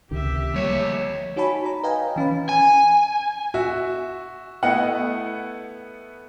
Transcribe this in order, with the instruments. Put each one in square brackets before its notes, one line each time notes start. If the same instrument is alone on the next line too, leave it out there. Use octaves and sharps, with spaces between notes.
[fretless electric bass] C#2 C3 D#3 [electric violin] G4 E5
[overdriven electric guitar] D2 C#5 [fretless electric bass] F3 G3 A#3
[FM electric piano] D#4 F#4 C#5 G#5 A5 B5
C#5 A#5
B4 D#5 F5 G5 G#5 A#5
E3 C#4 F5 B5
[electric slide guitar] G#5
[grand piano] F#4 E5
A3 B3 E4 D#5 F#5